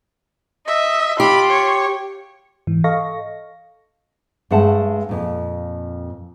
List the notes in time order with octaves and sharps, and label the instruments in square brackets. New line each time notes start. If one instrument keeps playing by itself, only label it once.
[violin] D#5 [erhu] E5
[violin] F4 [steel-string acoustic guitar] G4 [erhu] B5
[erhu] C#5
[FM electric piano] G#2 E3
A4 D#5 F5 C#6 A#6
[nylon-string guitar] G2 G#3 A3 F#5 A5
F2 A#2